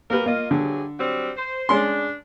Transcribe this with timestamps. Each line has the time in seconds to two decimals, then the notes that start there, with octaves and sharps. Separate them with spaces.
0.10 F#3 A#3 G4 A#4 B4
0.26 A#3 F4 A#4 D#5
0.51 G2 D3 F#3 G#4
0.99 F#3 G3 C4
1.35 C5
1.69 G#3 C#4 D4 C6